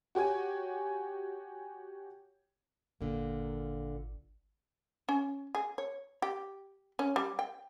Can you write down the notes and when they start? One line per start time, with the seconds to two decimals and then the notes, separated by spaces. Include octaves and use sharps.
0.15 F#4 G4 C#5 G#5
3.01 G#1 A#2 D3 A#3
5.09 C#4
5.55 G#4
5.78 C#5
6.22 G4
6.99 C#4
7.16 G3
7.39 G5